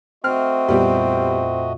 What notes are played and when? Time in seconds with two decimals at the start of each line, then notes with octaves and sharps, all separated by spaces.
0.24 A3 C4 F#4 D#5 F6
0.68 F2 A#2 G3 B3 F4 G4